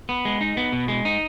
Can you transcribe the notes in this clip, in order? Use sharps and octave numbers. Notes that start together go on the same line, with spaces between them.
B3
G#3
D#4
B3
B2
G#3
D#4